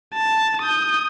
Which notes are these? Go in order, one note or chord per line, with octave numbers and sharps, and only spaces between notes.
A5
D#6 G6